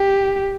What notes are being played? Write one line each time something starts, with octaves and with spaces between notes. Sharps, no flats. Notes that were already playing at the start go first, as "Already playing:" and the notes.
Already playing: G4